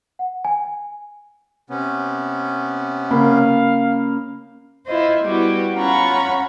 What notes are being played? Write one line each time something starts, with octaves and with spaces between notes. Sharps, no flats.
F#5
G#5
C3 B3 C#4
C#3 A#3 F5 B5
E4 F4 C5 D#5
G3 B3 E4 F#4 G4
C#4 F4 F#5 A#5 B5 C#6